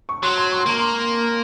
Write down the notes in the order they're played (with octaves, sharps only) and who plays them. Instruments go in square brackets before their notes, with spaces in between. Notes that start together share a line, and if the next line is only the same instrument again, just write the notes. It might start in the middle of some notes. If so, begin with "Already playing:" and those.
[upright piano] C#6
[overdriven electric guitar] F#3 [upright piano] C6
[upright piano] C6
C#6
C6
[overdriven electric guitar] A#3 [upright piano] A#5
[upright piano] C6